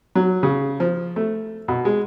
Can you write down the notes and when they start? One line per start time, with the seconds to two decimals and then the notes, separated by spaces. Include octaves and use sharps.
0.15 F#3
0.43 C#3
0.80 F3
1.16 A3
1.68 B2
1.85 G#3